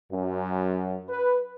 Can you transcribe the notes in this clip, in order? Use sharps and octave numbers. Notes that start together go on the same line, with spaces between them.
F#2
B4